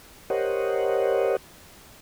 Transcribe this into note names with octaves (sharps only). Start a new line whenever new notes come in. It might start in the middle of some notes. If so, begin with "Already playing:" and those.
G4 A#4 C5 C#5 D#5 F#5